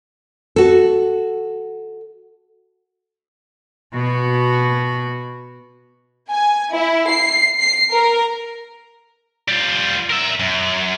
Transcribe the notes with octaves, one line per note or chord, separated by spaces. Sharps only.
F#4 A4
B2 F#4
G#5
E4
C7
C7
A#4
G3 F4
A#4 E5
F#2